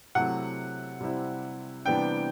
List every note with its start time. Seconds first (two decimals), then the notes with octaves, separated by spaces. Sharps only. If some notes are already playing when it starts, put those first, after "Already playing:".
0.15 C3 F#3 A3 E4 F#5
1.00 C3 G3 C4 E4
1.85 C3 E3 G3 B3 D4 G5